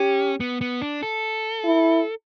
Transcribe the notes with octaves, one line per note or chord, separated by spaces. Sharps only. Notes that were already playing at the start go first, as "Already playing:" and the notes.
Already playing: C#4 G4
B3
B3
D4
A4
E4